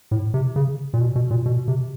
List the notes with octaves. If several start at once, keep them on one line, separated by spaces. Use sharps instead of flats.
A2
C3
C#3
A#2
B2
B2
A#2
B2
C3